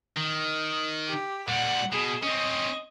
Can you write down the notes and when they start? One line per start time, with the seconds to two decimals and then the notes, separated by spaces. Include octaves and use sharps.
0.17 D#3
1.08 G4
1.48 A#2 G3 F#5
1.92 B2 G#4
2.23 C4 C#4 D#5